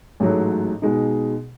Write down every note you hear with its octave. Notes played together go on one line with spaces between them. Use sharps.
A1 G#2 F#3 A3
B2 G#3 D#4